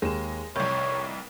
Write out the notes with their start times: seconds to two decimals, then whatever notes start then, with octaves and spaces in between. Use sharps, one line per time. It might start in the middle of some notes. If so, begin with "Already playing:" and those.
0.02 D#2 G#3 E7
0.56 F1 C2 C#5 G6